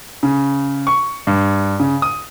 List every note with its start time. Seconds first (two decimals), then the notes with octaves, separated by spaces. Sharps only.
0.23 C#3
0.87 C#6
1.27 G2
1.80 C#3
2.02 D#6